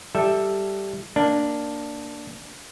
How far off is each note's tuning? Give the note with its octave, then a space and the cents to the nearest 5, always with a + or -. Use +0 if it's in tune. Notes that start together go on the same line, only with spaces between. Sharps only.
G3 +0 A4 +0 E5 +0
A#3 +0 D4 +0